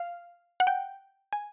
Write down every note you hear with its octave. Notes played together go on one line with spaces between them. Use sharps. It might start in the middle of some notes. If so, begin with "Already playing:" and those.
Already playing: F5
F#5
G5
G#5